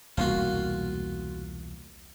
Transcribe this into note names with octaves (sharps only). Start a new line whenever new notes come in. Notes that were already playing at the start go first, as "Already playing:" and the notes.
E1 C2 A#3 F4 F#4